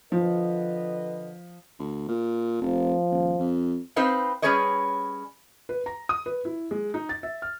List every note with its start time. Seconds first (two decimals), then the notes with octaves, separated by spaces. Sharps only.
0.12 D3 F3 B4 D#5
1.79 D2
2.08 A#2
2.61 F1 F3
3.10 D#1
3.39 F2
3.96 C4 D#4 B4 C5 F5
4.42 G3 C#4 G#4 B4 C#5 D#5
5.69 B4
5.86 A#5
6.09 D#6
6.26 B4
6.45 E4
6.71 G#3
6.94 D#4
7.09 A6
7.23 E5
7.42 F6